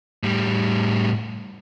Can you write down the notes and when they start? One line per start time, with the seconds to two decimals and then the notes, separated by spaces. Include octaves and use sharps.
0.23 A2 G3